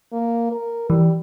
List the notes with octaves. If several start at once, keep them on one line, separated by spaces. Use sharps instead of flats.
A#3
A#4
E3 G3